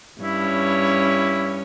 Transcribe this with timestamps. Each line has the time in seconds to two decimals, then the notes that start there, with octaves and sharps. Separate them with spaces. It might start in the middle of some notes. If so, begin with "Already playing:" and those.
0.21 G2 C#4 E4 C#5